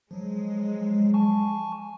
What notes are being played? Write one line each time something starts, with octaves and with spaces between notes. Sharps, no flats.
F3 F#3 G#3
G#5 A5 C#6